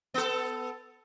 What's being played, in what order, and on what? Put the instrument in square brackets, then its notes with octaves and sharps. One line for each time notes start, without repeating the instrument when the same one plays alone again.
[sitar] B3 A4